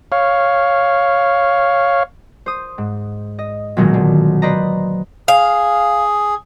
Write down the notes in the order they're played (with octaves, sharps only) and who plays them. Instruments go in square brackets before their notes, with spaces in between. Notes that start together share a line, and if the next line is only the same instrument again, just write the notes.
[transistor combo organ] C#5 F5
[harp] C5 D#6
G#2
D#5
B1 A#2 D#3 F#3 G#3
D3
B4 C5 D5 D#5 A#5
[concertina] G#4 [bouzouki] F5